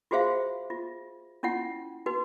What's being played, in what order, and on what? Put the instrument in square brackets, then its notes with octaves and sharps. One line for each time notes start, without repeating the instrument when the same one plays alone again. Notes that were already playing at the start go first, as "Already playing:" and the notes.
[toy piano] F4 F#4 G#4 C5 E5 F5
F4
C#4 E4 F4 F#5
D#4 F#4 B4